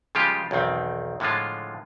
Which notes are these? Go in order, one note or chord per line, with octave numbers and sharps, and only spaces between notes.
C#3 F3 G3 G#3 F4 G4
B1 E2 D#3 C4
A2 D3 F3 G#3 F4